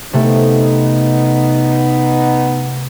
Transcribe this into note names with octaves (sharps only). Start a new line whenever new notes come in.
C3 A3 B3 D#4